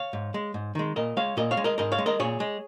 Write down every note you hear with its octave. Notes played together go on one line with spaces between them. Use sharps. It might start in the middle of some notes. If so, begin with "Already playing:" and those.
Already playing: C#5 F5
G#2
G#3
G#2
D#3 G#3
A#2 A#4 D#5
G#3 C#5 F5
A#2 A#4 D#5
C#5 F5
G#3
A#4 D#5
G#2 A#4 D#5
C#5 F5
G#3
A#4 D#5
A#2 G#4 C#5
G#3